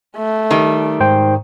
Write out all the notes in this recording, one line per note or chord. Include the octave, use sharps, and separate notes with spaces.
A3
D#3 G3
G#2 C5 G5